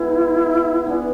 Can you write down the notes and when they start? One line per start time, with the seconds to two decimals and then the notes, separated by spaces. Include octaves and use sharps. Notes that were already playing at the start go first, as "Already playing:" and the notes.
Already playing: E3 G#3 B3 E4
0.85 E3 B3 D4